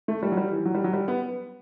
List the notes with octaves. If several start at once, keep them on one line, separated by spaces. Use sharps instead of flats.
A3
G3
F#3
G3
E3
F#3
G3
F#3
G3
B3